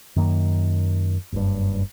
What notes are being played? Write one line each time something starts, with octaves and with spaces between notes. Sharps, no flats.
F#2 D#3 A#3
F#1 G2